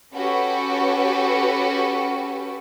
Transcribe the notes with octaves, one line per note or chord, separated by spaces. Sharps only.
C#4 F#4 G4 A4 B4